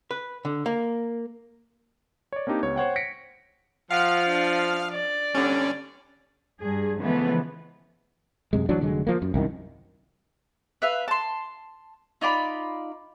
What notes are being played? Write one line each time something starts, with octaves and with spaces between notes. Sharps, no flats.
B4
D3
A#3
C#5 D5
A#3 C4 D4 D#4 G4
C#2 B3 C#5
C5 C#5 F#5 G5
A#6 B6 C#7 D7
F3 F5 F#5 F6
D4
D5
D3 G3 C#4
G2 G#4
C#3 E3 F3 G#3 A3 B3
F#2 C3 G#3
D2 E3 F#3 D4
F1 D3 F#3 G#3
F3 A#3
F#2
C2 F#2 D#3
B4 E5 F5
A5 C6
D#4 F4 D5 B5